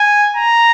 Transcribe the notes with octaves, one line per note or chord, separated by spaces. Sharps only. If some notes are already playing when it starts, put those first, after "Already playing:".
Already playing: G#5
A#5